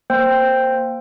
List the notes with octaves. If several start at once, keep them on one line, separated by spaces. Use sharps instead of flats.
A#3 C5 G5